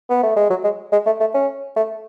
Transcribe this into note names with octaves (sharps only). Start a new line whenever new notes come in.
B3
A3
G#3
F#3
G#3
G#3
A3
A3
C#4
A3